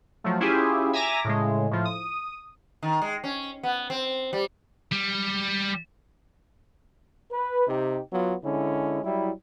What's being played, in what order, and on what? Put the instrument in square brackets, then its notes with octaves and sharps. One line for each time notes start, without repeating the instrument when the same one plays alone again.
[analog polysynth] F3 F#3 A3
C#4 E4 F4 G4 G#4
E5 G#5 A#5 D6 A#6
A2 C#3 G#3
A2 F3
D#6
[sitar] D#3
G#3
C#4
B3
C4
G3
[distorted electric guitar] G3
[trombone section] B4
C3 D#4 G4
F#3 B3 F4
D3 G#3 C#4 E4
F#3 G3 E4